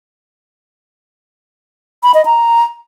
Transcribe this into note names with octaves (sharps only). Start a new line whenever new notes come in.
B5
D#5
A#5